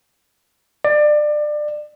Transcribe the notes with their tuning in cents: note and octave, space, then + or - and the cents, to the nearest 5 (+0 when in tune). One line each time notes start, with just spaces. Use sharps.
D5 +25